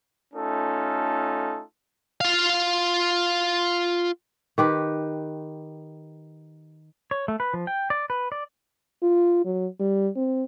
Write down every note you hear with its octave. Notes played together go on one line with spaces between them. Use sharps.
A3 C#4 D#4 F4 A4
F4 F5
D#3 G4 B4
C#5
A3
B4
F3
G5
D5
B4
D5
F4
F#3
G3
C4